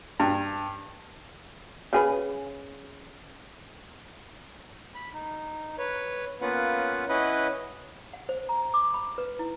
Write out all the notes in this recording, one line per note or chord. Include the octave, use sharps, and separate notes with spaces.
G2
C#3 G#4 B4
B5
D#4
B4 C#5
A#3 B3 C#4 F4 B4 F#5
C#4 E4 B4 D#5 F#5 B5
F#5
C5
A#5
D6
B5
B4
E4